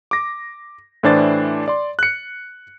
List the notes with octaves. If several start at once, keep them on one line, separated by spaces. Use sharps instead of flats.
D6 A#6
A2 E3 D4 C5 D5 A6
D5 C6
F#6 C#7